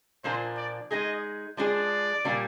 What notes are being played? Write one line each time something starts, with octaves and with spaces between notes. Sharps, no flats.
A#2 F3 A#3 D4 C5
D5
G#3 D#4 G#4 D#5
F3 G#3 D4 G#4 D5
A#2 G3 A#3 D4